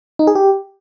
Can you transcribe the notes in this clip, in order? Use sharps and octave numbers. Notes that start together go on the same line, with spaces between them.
D#4
G#4
G4